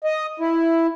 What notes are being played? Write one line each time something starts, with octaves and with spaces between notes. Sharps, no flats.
D#5
E4